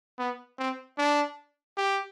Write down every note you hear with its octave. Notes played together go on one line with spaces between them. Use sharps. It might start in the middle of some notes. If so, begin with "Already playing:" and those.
B3
C4
D4
G4